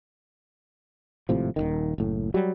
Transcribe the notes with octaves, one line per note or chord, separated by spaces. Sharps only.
G#1 A2 C3 F3
D#1 C2 D#3
F#1 A2
F#3 G3